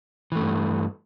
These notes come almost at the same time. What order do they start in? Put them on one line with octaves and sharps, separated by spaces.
E3 A3 G2